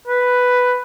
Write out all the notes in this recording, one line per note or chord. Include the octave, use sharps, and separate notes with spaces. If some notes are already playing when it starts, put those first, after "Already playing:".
B4